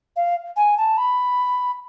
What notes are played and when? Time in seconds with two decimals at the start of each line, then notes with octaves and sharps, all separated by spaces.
0.16 F5
0.56 G#5
0.77 A5
0.97 B5